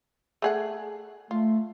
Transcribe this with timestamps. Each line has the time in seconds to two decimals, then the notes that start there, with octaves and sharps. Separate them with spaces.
0.42 A3 G#4 F#5
1.31 A3 F4